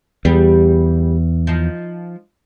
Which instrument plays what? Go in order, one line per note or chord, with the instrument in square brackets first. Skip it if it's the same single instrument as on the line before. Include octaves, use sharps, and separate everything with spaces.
[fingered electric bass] E2 [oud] G3 G4 G#4
[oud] F3 D#4